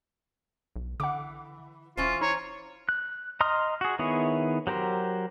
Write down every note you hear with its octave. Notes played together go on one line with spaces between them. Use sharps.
B1
D3 E3 F#5 D6
E1 E3 C#4 F4 C5
E4 C#5 A#5
F#6
D#5 A#5 C6 D#6 F6
F#4 G#4
D#3 B3 E4 G#4 C#5
F#3 G4 A#4 C5